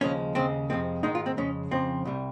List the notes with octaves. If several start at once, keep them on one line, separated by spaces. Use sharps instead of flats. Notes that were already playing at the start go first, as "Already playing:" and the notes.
D#2 C#3 F3 G#3 C#4
D#2 C#3 G#3 C4
F2 C3 F3 G#3 C4
G#2 D#3 G#3 D#4
F4
C4
F2 C#3 G#3 C#4
F2 C#3 F3 C4
C2 C3 G3